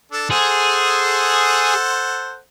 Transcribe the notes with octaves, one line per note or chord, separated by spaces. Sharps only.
D4 A4
G#4 A4 C5 F#5